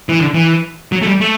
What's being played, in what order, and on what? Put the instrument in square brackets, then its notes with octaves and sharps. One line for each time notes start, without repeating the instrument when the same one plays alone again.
[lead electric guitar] E3
D3
E3
F#3
A3
G3
A3